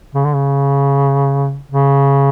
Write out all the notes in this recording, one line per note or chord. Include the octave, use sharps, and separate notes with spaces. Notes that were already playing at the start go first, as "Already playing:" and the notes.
C#3
D3
C#3
C#3